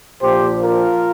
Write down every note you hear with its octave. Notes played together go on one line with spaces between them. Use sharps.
A#1 A#2 F3 G4 C5
F4 A#4